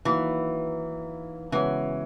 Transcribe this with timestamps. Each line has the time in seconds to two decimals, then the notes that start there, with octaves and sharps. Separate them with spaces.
0.05 D#3 E3 F#3 A#3 E4
1.52 C#3 E3 G#3 B3 F#4 C#5